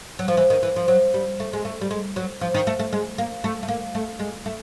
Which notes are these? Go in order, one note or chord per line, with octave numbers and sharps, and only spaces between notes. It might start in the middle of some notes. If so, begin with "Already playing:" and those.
F#3
F3
E3
D#3
E3
F3
F#3
G3
A3
G#3
A3
G3
G#3
F#3
F3
D#3
A3
A3
G#3
A#3
A3
A3
A#3
A3
G#3
A3